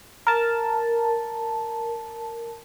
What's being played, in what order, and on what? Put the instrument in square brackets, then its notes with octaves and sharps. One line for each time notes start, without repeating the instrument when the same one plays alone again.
[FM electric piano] A#4 A5